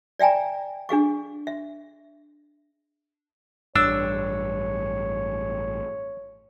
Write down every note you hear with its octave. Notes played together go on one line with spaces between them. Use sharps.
D5 E5 G5 G#5 A#5
D4 G#4 F5 C#6
E5
A1 G2 D4 C#5 E6